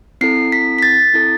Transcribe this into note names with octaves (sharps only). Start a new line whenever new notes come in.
C4 E4 A4 C7
B6
B6
A6
C4 E4 A4